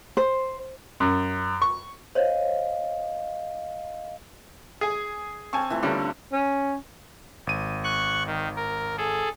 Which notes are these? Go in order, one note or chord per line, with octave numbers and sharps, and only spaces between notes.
C5
F#2
C#6
C5 C#5 D#5 F5
G#4 G#5
C4 F5 G#5 A5 C#6
E3 F3 A3
D3 G3 A3 C#4 D4 A#4
C#4
G#1 D#7
C#6 F#6
D#3
A#4
G#4 A4